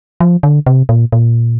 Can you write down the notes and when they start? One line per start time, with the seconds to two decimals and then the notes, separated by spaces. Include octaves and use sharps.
0.20 F3
0.43 D3
0.66 C3
0.89 A#2
1.12 A#2